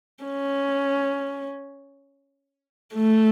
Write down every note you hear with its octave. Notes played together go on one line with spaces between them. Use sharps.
C#4
A3